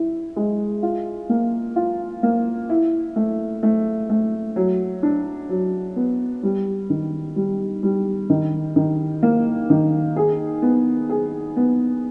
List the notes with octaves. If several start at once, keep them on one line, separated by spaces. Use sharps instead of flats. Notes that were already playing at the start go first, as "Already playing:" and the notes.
Already playing: E4
G#3
F4
A#3
F4
A#3
E4
A3
A3
A3
F#3
D4
F#3
B3
G3
D#3
G3
G3
D#3
D#3
A#3
D#3
G#4
B3
G#4
B3